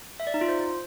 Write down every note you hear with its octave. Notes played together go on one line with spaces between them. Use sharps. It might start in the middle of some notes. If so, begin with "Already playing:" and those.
E5
D5
D#4
F4
C5